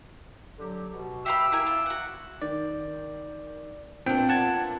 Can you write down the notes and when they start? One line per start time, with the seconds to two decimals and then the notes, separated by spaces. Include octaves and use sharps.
0.59 D3 F#3 G4
0.94 B2
1.26 G4 E5 F5 B5 D6 E6
1.52 E4 A#4 G#5
1.67 F4
1.86 F#4 F#5
2.42 D#3 D5
4.06 A#2 B3 C4 D4 G5
4.29 F#5 A5 G#6